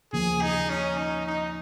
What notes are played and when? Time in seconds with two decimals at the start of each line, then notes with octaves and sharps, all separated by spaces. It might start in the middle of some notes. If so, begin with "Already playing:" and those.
0.13 D#2 C#3 F3 A#3 G#4
0.41 D#4
0.70 C#4
0.97 D#4
1.26 D#4